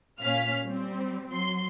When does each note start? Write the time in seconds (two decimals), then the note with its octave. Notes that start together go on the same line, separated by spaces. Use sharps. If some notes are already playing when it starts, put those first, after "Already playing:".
0.20 A#2 C#4 F5 F6 B6
0.65 G3 C4
1.33 F#3 C6